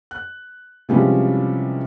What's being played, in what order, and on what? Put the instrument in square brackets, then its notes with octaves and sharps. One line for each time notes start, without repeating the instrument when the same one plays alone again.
[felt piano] F#6
C3 E3 F3 G3 G#3 C#4